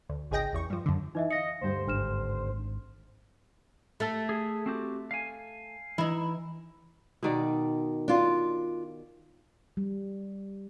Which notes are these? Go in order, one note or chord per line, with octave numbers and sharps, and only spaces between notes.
D2
G#1 C#2 G#4 D#5 G5 A#6
A1 E2 C#6
G2 F3
F#2 D3
E3 D#4 D#5 E5
D#5 F5 A#6 C#7
D2 G2 G4 C5
G#1 D4 F6 E7
A3 A4
G#4
C4 F#4 G4
F5 G#5
E3 D#4 E4
B2 D#3 D5
D4 F4
G3